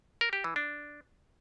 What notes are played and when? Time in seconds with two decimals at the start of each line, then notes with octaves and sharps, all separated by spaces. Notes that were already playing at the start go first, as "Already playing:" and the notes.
0.21 A#4
0.33 G4
0.44 E3
0.56 D4